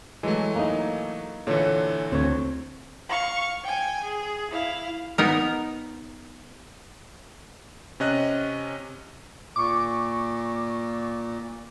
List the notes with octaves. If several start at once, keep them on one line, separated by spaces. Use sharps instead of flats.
E3 F#3 G#3 A3
A#3 D#4
A#2 D3 E3 A4 C#5
D2 C4 C#5
F5 C#6
G5 G#5
G#4
E4 F5
B3 D#4 A#4
C3 C#4 D#5 F#6
A#2 C#6 D6